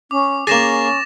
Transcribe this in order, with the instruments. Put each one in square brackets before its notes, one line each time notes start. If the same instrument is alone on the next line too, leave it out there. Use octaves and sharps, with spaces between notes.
[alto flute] C#4 [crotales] D6
[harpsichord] A#3 G#4 [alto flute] C#4 [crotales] A6 A#6 E7